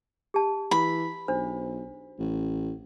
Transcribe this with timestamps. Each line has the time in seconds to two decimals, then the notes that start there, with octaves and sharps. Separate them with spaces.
0.34 G4 A5
0.71 E3 B5
1.28 B1 D4 C5
2.19 A1